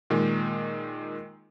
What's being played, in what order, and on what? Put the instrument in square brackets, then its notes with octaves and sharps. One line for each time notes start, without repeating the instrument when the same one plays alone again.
[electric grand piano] A#2 D#3 G#3